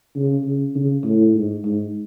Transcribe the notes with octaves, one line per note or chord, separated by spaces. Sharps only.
C#3
C#3
C#3
A2
G#2
G#2